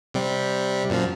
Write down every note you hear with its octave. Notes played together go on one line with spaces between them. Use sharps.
C3 G3
F#2 A#2 F3